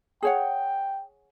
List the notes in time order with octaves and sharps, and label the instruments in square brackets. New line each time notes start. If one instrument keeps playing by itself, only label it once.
[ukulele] G#4 C#5 F#5 [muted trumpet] G5